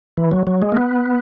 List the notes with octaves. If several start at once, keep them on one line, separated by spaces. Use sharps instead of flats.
E3
F#3
F#3
G#3
A#3
B3